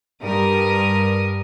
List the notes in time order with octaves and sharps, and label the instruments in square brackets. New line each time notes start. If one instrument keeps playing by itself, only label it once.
[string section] G2 G4 A#4 D#6